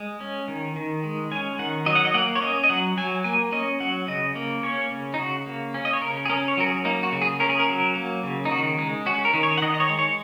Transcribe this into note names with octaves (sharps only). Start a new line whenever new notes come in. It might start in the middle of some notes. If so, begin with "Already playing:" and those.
Already playing: G#3
C#4
D#3
D#3
G#3
C#4 G#5
D#3 F#5
F#3 D#5
F#5
D#5
A#3 F#5
C#5
C#4 D#5
D#5
F#3 F#5
F#3 G#5
A#3 G#5
C#4 D#5
F#3 F#5
C#3 D#5
A#3
C#4 C#5
C#3
D#4
C#3 F#4
A#3
C#4
D#5
C#5
C#3 A#4
G#4
C#4 A#4
C#5
F#3 A#4
G#4
A#3 D#4
F#4
C#3
G#4
C#4 A#4
G#4
A#4
F#3
A#3
C#3
D#4
D#3 F#4
G#3 D#4
C#4 F#4
A#4
D#3
C#5
F#5
D#3 D#5
D#5
C#5
G#3
C#5